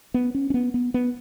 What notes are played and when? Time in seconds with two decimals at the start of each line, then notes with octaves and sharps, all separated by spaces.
0.14 B3
0.35 C#4
0.50 C#4
0.54 B3
0.74 B3
0.94 B3